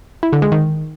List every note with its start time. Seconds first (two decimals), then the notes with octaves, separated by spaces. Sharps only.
0.23 E4
0.33 D3
0.42 G#3
0.52 D#3